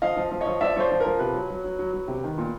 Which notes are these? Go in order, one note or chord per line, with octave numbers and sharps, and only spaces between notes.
F3 D#5 F5
F3
F3
C#5 D#5
F3
F3 D5 E5
F3 C5 C#5 D5
F3
A#4
F3
C3 B4
F#3
F#3
F#3
F#3
F#3
C3
D#3
A#2